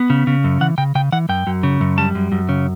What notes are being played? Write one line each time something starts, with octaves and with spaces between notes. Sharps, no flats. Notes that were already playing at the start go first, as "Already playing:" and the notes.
Already playing: B3
C#3
C#3
F#2
E3 F#5
C#3 G5
C#3 G5
E3 F#5
F#2 G5
F#2
C#3
F#2
G3 A5
F#2
F#2
C#3